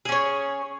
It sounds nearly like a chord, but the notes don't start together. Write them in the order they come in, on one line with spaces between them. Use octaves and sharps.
G#4 C#4 C#5